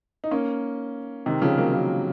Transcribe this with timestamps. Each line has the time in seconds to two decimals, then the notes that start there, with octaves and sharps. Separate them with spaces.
0.24 D#4
0.31 A#3 C#4
1.26 C3 D#3
1.42 C#3 F3
1.58 F#3 A#3
1.73 F#3 A#3